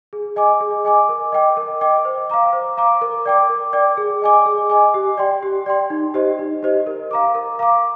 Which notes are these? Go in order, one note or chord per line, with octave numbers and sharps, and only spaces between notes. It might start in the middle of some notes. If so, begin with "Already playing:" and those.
G#4
D#5 G#5 D6
G#4
D#5 G#5 D6
A#4
D#5 G5 D6
A#4
D#5 G5 D6
C5
F5 A#5 D6
C5
F5 A#5 D6
A#4
D5 G5 D6
A#4
D5 G5 D6
G#4
D#5 G#5 D6
G#4
D#5 G#5 D6
G4
D5 G5 C6
G4
D5 G5 C6
D#4
G4 C5 D#5
D#4
G4 C5 D#5
A#4
F5 A#5 D6
A#4
F5 A#5 D6